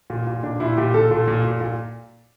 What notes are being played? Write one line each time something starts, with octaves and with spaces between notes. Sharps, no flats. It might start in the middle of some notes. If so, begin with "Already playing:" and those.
A#2
A#2
A#2 D4
A#2 E4
A#2 G4
A#2 A4
A#2
A#2
A#2
A#2